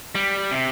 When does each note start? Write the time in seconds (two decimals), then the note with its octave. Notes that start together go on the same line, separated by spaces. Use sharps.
0.15 G3
0.51 C3